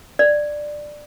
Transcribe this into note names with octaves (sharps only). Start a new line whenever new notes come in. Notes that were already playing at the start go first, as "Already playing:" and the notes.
D5